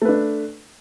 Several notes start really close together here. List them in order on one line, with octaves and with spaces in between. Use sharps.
A3 B4 D4